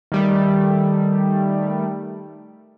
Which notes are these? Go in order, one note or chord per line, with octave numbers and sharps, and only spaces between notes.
D#3 G3 A3